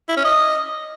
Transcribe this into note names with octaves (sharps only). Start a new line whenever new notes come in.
E4
C#4
D#5